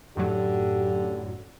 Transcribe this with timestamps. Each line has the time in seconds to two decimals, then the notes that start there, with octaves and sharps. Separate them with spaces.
0.17 F#2 A2 D3 F#3 G4